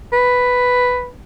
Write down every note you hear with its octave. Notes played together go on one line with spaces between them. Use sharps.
B4